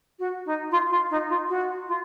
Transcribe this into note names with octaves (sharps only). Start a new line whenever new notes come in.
F#4
D#4
F4
F4
D#4
F4
F#4
F4